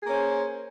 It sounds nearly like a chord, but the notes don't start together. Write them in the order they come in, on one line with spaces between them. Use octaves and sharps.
G#4 A#3 C#4 C5